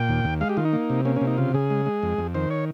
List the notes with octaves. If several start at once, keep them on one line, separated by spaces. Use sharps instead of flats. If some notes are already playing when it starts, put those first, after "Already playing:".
Already playing: A#2 G5
D#2
D#2
G#3 F5
G4
D#3 F4
D#4
A#3
C3
A#3 C#4
C#4
C3
D#4
C#3 F4
C#3 G#4
G#3
G#3
F2
F2
D#3 C5
C#5